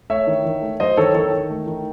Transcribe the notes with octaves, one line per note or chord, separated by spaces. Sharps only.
A3 C#5 E5
D#3
D#3
A3
F#3 C5 D#5
D#3 A4 C#5
D#3 A4 C#5
D#3
A3
D#3